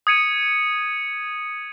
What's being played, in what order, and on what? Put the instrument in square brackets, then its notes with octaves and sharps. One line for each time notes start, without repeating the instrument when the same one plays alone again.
[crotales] D#6 G#6 C#7 D#7